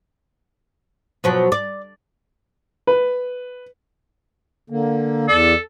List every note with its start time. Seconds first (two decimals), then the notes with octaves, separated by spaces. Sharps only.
1.24 B2 F3 F#3
1.52 D5
2.87 B4
4.70 D3 A#3
5.28 E2 A4 D5